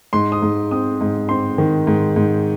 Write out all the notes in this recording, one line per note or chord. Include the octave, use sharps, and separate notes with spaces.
G#2 C6
D#6
G#2
C4 D#6
G#2
C4 C6
D#3
G#2
G#2